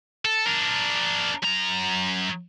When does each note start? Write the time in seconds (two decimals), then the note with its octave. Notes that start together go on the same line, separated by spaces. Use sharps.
0.25 A4
0.46 D4 A#4
1.43 F#2 A#5